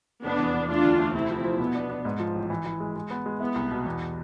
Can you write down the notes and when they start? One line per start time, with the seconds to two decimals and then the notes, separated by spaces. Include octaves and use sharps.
0.24 F1 B3 D4
0.39 E2
0.54 E2
0.69 A3 D4 F4
0.85 D2
0.99 A3
1.15 C3 C4 E4
1.30 F3
1.44 F3
1.60 B2 B3
1.75 D4
1.90 D4
2.05 G#2
2.20 F3
2.35 A1
2.50 E3
2.66 E3
2.80 G#3
2.96 G#3
3.10 B3
3.26 G#3
3.40 B3 E4
3.55 C2
3.71 B2
3.86 E2